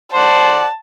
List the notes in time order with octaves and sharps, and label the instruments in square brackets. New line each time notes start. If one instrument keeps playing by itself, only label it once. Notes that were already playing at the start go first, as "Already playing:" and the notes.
[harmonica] C5 D5 F#5 [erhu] A5